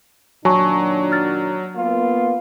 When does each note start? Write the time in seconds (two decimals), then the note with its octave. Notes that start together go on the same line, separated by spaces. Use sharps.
0.45 A#2 D#3 F#3 D4 G#5 A5 C#6
1.12 F6 A6
1.76 A#3 B3 F4